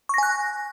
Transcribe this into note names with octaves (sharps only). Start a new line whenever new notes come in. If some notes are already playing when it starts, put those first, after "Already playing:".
G#5 C#6 F#6 A#6